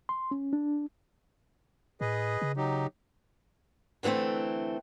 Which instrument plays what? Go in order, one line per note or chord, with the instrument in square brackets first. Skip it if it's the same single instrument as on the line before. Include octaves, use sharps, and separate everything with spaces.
[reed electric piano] C6
C#4
D4
[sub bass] A2 [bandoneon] G#4 B4 D#5
[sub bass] C#3
[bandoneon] F#3 D#4 G4
[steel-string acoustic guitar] D3 E3 G3 A3 C4